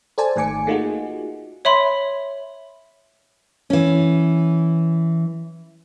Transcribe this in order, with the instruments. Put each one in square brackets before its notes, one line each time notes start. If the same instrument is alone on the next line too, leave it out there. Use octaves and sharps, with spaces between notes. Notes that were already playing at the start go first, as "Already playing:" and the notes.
[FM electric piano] A4 C5 D5 G#5 A5
G#1 D#3 A3 G#5 D6 C#7
A3 A#3 D#4 F4 F#4 G#4
[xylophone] C#5 E5 B5 C6
[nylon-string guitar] E3 C#4